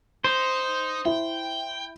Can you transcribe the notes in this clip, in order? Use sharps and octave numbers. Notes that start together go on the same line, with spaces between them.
D#4 C5
E4 G5